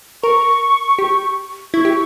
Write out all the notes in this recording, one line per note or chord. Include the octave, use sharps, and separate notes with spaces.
A#4 C#6
G4
E4 C#6
G4